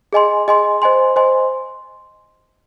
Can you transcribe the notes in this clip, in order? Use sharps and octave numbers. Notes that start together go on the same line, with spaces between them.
G#4 D#5 G#5 C6
G#4 D#5 G#5 C6
C5 D#5 G#5 C6
C5 D#5 G#5 C6